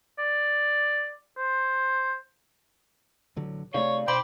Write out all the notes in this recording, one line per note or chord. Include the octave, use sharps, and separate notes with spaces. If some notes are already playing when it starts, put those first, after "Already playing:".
D5
C5
A1 D3 F#3
C3 A3 D#4 C#5 D5 F5
B2 C5 G5 B5 C6 D6